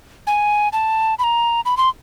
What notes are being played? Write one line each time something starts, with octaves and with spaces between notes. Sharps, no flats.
G#5
A5
B5
A#5
B5
C6